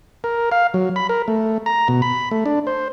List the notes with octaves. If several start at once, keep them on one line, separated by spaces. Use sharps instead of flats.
A#4
F5
F#3
B5
A#4
A3
A#5
B2
B5
A3
D4
C5